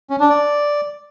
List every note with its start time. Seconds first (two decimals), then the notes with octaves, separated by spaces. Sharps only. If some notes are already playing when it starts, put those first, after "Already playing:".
0.10 C#4
0.20 D4
0.30 D5